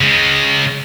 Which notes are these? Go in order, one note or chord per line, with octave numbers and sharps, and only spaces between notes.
C#3 G#3